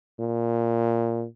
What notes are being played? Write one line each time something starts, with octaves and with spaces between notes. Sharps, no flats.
A#2